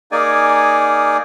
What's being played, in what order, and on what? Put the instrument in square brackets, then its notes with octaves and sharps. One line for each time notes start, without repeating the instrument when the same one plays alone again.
[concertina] A#3 D#4 G#4 D5 G#5